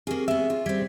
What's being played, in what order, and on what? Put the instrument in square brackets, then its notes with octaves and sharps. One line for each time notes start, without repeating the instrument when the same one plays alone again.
[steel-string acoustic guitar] A#3 G#4 [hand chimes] C4 G4
[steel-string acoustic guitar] G#3 B3 [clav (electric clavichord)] E5
[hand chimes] C#4 [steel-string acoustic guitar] F4
[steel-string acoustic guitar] G3 C4 [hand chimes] G#6 B6